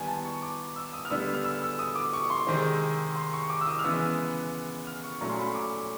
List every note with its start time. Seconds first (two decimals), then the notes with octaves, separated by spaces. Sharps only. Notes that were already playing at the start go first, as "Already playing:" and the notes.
Already playing: D#3 G3 B3 G5 G#5
0.08 A5
0.25 C#6
0.42 D6
0.76 E6
0.94 D#6
1.05 F6
1.10 D3 G3 B3 E6
1.33 F6
1.44 E6
1.62 E6
1.79 D#6
1.95 D6
2.13 C#6
2.30 C6
2.47 C3 D#3 G#3 C4
3.16 C6
3.33 C#6
3.50 D6
3.61 E6
3.67 D#6
3.79 F6
3.84 C#3 E3 G#3 B3 E6
4.87 F6
5.04 C#6
5.21 A#2 F#3 A3 C#4 A#5
5.29 C6
5.38 B5
5.55 D6